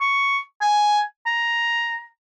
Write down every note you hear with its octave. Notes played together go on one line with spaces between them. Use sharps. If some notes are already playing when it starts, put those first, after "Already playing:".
C#6
G#5
A#5